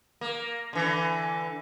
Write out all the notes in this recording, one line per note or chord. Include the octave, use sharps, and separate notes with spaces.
A#3
D3 E3